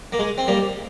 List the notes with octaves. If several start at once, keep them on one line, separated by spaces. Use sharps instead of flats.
A#3
G#3
C4
G3 A#3